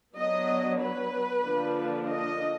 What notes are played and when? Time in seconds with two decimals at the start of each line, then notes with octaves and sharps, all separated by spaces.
0.16 F#3 B3 D4 D#5
0.80 B4
1.43 D3 F3 A#3 D4
2.07 D#5